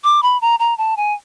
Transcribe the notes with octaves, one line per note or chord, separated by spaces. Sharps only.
D6
B5
A#5
A#5
A5
G#5